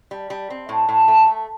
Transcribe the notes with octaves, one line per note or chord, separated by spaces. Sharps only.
G3
G3
C4
A2
A2
A3
A3